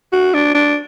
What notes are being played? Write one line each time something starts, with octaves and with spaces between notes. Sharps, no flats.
F#4
D4
D4